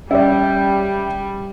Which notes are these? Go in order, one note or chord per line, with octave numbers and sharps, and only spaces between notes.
G3 C#4 D5 E5 G5